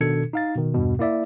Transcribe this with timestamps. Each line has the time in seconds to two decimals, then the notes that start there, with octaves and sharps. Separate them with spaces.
0.01 B2 D#3 D4 A4 G#6 C#7
0.33 D#4 F5 A6
0.56 B2 D#3
0.74 E2 G2 B2
0.99 A#3 E4 D5 E5